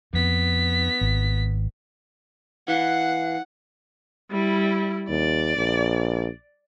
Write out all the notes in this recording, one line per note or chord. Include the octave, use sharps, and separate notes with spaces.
F2 B3 B6
G#1
E3 F5 F#5
G3 E4
D#2 D5
A#1